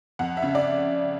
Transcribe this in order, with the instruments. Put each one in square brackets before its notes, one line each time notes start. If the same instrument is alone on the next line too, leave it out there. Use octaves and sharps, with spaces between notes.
[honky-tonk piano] F2 F#5
E5
C#3
D5